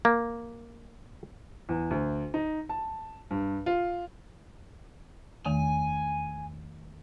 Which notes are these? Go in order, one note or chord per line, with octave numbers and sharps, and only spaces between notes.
A#3
E2
D2
D#4
A5
G2
F4
E2 D#3 A3 G#5